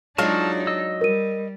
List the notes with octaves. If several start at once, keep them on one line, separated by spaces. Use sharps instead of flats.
F#3 G#3 D4 D#4 F4 A5 C#6 F6
D#5 E6
G3 A#4 D#7